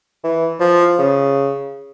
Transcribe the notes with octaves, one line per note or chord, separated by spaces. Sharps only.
E3
F3
C#3